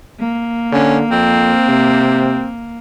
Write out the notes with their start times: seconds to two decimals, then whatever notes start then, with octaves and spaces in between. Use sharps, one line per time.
0.19 A#3
0.72 D3 C#4
1.11 F2 C4
1.69 C3